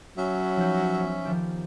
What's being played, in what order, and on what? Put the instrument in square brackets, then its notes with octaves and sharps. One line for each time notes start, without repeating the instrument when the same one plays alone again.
[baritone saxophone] F#3 [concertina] C#4 E5
[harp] F3 D#4 G6
B3
D#3 F3 G4